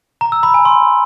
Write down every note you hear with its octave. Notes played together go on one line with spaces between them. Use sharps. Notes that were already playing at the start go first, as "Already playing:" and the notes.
A#5
E6
B5
G#5
C6